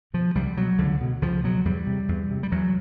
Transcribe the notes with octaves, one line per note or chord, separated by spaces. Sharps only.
B2 F3
C2 G3
B2 F#3
C#2 D3
B2
C#2 F3
B2 F#3
E2 G3
C3
E2
C3
G3
E2 F#3